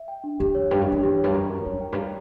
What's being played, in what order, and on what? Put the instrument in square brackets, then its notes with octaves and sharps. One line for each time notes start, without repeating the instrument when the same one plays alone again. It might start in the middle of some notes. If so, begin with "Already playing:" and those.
Already playing: [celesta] E5
G5
D4
[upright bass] E2 [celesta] G4
[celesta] C#5
[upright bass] G2 [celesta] G5
[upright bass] F#2
[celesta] D4
[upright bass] F#2
[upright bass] E2 [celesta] G4
[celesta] C#5
[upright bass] G2
[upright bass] F#2 [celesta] A#5
[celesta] A#4
[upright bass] E2 [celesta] C#5
[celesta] G5
[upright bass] G2
[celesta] A#5